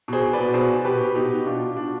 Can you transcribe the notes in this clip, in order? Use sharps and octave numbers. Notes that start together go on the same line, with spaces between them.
B2 G#4 C5
B2
B4 D5
B2
B2 G#4 C5
B2
B2 G4 B4
B2
B2 D#4 G4
B2
B2 D4 F4
B2
B2 D4 F4